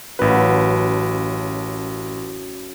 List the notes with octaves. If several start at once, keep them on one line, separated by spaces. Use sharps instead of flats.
A1 F#2 B4 F5 A5